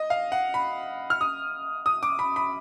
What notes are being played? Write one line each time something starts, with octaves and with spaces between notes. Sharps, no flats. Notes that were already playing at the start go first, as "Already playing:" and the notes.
Already playing: D#5
F5
F#5
B5
F6
D#6
D#6
D6
B5
B5